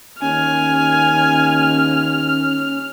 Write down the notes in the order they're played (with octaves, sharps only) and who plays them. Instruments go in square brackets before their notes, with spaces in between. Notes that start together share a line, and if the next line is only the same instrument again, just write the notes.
[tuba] D#2 [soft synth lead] C#4 [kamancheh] G#5 [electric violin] F6